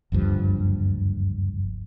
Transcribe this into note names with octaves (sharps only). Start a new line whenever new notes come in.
F#1 D2 G2 F3